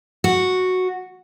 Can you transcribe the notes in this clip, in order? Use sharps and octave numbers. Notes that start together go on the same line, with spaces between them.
F#4